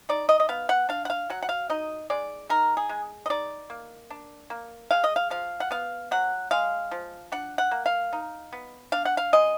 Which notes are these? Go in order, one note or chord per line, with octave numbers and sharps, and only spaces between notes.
D#4 D5
D#5
D#5
B3 F5
F#5
D4 F5
F#5
F5
F#3 F#5
F#5
F5
D#4 D#5
G#3 D5
D#4 A#4
G#4
G#3
D#5
D#4 D5
A#3
D4
A#3
G#3 F5
D#5
F5
F3 F5
F#5
B3 F5
F#3 F#5
G#3 F5
F3
D4 F#5
F#5
A#3
F5
D#4
B3
D4 F5
F#5
F5
G#3 D#5